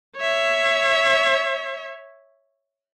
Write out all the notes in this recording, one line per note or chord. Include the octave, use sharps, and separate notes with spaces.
C#5 E5